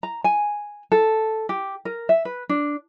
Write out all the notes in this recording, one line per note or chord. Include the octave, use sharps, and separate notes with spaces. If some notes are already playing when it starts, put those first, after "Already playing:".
A#5
G#5
A4
G4
A#4
E5
B4
D4